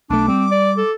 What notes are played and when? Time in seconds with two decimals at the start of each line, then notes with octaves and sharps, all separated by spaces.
0.10 B1 A3 D4 D6
0.28 G3 C4
0.51 D5
0.78 A4